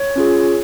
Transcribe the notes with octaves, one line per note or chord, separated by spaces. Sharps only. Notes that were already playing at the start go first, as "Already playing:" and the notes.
Already playing: C#5
C#4 F4 G#4